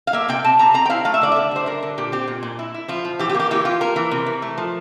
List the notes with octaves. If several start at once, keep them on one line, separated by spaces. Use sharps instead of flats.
F5
A#3 E5
C3 G5
C3 A5
C3 A#5
C4 A#5
G5
E4 F5
A3 F5
E5
D3 D5
D3 E5
G3 C5
D3 A#4
D3
A#2 G4
C4 G4
A#2
A#2
E4
E4
F3 F4
F3
E3 G4
G4
A#3
G4
E3 G4
F4
A#3 A#4
E3
C3
E3
A3
F3